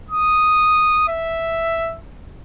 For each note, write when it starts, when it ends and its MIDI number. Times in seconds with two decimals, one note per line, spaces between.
0.10 1.05 87
1.08 1.95 76